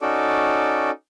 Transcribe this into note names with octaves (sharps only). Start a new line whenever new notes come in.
C#4 D#4 F#4 A4 D5